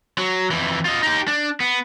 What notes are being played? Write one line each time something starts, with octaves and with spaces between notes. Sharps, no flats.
F#3
F2 E3
F4 D#5
D#4 G4
D4
B3